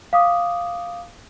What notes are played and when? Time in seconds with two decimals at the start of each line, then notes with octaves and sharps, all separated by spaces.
0.13 F5 D6 D#6